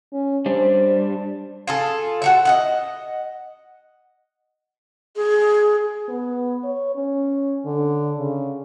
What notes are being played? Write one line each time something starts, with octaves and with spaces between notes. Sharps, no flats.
C#4
G3 D4 C5
F4 G#4 A4
F#4 A4 E5
D#5 E5 F#5
G#4
B3
C#5
C#4
D3
C#3